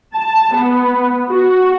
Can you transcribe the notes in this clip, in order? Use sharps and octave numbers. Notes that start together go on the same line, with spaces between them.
A5
B3
F#4